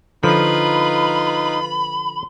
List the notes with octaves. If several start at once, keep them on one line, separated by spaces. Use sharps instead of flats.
D3 F3 D#4 F4 B4 B5